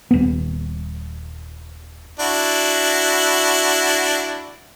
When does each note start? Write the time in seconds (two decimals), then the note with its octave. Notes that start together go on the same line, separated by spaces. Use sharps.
0.11 D#1 B3
2.20 D4 E4 F#4